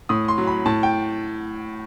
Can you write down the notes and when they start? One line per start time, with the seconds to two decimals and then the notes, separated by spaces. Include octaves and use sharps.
0.09 A2 D#6
0.28 C6
0.38 F#3
0.47 B5
0.66 A2 A5
0.83 G5